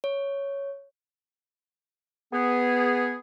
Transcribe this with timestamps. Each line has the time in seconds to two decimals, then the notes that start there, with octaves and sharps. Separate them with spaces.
0.04 C#5
2.33 B3 G#4